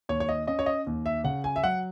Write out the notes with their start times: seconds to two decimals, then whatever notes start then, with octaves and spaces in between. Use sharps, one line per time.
0.09 D#2 C#5
0.20 C#5
0.29 D#5
0.47 C#4 D#5
0.59 C#5
0.66 D#5
0.87 D#2
1.06 E5
1.24 C#3 F#5
1.44 G#5
1.56 E5
1.63 F#3 F#5